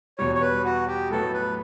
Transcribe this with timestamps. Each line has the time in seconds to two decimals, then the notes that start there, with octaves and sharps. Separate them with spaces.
0.18 E2 B2 G3 C#5
0.35 C#5
0.41 B4
0.64 F#4
0.88 G4
1.10 A2 F#3 B3 A4
1.34 B4